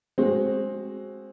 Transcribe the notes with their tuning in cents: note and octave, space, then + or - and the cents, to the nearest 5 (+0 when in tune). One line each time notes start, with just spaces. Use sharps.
G#3 +0 C4 +15 F#4 +10